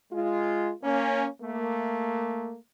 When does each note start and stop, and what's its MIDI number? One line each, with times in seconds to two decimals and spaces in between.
0.12 0.72 56
0.12 0.72 65
0.83 1.26 58
0.83 1.26 61
1.42 2.56 57
1.42 2.56 58